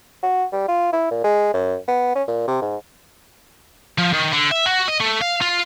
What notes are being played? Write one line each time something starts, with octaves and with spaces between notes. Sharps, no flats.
F#4
G3
F4
E4
A#2
G#3
F#2
B3
C#4
A#2
C3
G#2
F3
D#3
D3
E5
F#4
D#5
A3
F5
F4